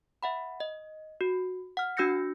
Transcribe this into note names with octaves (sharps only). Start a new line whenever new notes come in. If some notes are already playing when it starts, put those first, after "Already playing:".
E5 F#5 B5
D#5
F#4
F#5 F6
D4 F#4 E6 G6 A#6 C#7